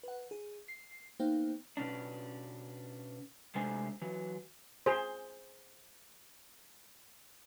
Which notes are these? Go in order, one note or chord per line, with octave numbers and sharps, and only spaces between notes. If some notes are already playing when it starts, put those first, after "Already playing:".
B4 F#5
G#4
C7
A#3 B3 D#4 C5 F5 G5
B2 C#4 D4
C3 G#3 A3 D4 C5 G#5
E3 F#3
G#4 C5